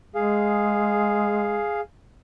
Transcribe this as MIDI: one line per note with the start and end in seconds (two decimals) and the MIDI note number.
0.15 1.65 56
0.15 1.81 68
0.15 1.81 77